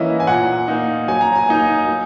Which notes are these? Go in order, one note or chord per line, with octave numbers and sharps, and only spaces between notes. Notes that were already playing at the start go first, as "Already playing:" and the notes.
Already playing: E3 A#3 C#4 E4 D#5 E5
G#5
A#2 F#5
A#3 D#4
F#3 G#5
A#5
G#5
A#3 D#4
F#3